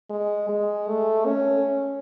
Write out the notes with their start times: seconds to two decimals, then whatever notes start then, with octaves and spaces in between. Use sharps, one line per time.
0.10 G#3
0.49 G#3
0.87 A3
1.26 C#4